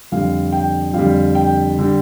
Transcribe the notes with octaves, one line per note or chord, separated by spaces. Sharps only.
F2 D3 G3 F5
G5
F2 D3 G3 F5
G5
D3 G3